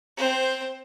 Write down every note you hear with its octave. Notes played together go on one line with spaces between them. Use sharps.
C4 C5